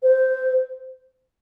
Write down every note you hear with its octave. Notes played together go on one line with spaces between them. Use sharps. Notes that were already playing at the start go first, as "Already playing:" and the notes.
C5